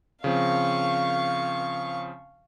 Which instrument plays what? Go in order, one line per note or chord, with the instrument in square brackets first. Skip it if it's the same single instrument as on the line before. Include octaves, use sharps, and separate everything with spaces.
[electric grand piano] C#3 F3 C4 [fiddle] F5 C#6